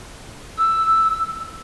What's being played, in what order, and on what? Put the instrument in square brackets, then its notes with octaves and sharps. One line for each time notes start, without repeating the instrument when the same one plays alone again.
[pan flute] E6